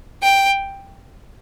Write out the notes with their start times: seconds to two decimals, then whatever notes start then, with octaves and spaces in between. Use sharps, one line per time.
0.23 G5